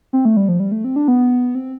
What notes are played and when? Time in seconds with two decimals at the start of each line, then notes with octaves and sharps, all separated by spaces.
0.13 C4
0.25 A3
0.37 G3
0.48 F3
0.60 G3
0.72 A3
0.84 C4
0.96 D4
1.08 B3
1.55 C4